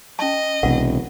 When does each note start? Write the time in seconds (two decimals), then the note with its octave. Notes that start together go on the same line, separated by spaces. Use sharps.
0.19 C#4 D#5 A5
0.63 E1 B1 C3 A#4 F#5